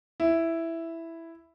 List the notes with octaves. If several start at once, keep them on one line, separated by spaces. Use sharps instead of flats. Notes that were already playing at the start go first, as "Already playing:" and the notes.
E4